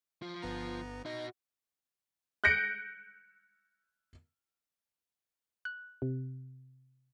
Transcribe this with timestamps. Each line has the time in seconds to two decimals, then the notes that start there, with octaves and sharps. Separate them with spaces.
0.22 F3 F4
0.42 G1 B3 A#5
1.06 D#4 F#4 D#5 A#6
2.44 F#6 G6 A#6 C#7 D7
5.65 F#6
6.02 C3